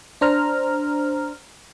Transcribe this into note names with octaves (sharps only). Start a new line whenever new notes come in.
D4 C5 A#5 F6